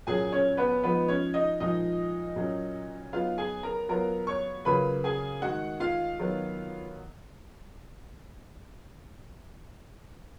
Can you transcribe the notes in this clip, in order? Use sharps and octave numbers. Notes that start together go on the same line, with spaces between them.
A#2 F#3 C#4 G#4 G#5
C#4 C#5
B3 B4
F3 G#3 B3 D#4 B4
C#4 C#5
D#4 D#5
A#2 F3 G#3 D#4 D#5
A#2 F#3 C#4
F#3 B3 D#4 F4 F5
G#4 G#5
A#4 A#5
F#3 B3 F4 A#4 A#5
C#5 C#6
C#3 F#3 A#3 C#4 F4 B4 B5
G#4 G#5
D#3 G#3 D#4 F#4 F#5
F4 F5
D#3 F#3 B3